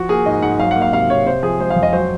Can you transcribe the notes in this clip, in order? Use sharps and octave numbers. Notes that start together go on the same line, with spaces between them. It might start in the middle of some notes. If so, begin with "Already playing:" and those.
Already playing: F3 F#4
A#3 G#4
G#2 D#5
G#2 F#5
F#3 F5
A#3 F#5
F5
C3 F5
C3 C#5
C3 C5
F3 G#4
G#3 C5
F5
F2
D#5
F#3 C5